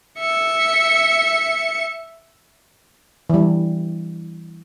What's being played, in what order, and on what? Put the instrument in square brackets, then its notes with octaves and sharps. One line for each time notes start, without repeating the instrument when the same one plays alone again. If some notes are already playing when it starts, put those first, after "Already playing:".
[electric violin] E5 C#7
[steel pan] E3 G3